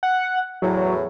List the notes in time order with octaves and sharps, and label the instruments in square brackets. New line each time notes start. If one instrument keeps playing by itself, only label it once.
[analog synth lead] F#5
[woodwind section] E2 A2 E3 [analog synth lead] F#3